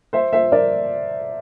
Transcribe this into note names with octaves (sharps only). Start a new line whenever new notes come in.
C5 E5
C5 E5
A#4 D5